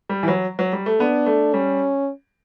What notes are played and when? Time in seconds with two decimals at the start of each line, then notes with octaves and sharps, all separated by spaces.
0.09 G3
0.23 E3
0.28 F#3
0.59 F#3
0.73 G3
0.86 A3
1.00 B3 D4
1.26 A3
1.53 G3 C#4